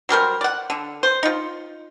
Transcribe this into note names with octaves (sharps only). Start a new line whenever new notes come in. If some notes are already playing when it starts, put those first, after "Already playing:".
F#3 G3 A#4 C5
D5 F#5
D3
C5
D#4 F4